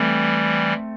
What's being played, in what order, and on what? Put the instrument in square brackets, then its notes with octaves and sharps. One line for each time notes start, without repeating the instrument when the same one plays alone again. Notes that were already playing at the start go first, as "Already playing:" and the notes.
Already playing: [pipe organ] E3 G3 [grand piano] A3 C4